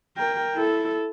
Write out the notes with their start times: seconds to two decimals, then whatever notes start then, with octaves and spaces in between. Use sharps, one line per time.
0.17 A#4 G5
0.55 E4 A4